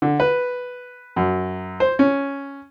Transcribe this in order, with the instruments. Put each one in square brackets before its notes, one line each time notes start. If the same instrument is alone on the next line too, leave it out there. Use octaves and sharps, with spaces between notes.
[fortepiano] D3
B4
F#2
C5
C#4